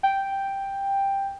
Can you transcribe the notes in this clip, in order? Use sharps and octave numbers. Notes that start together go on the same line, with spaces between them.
G5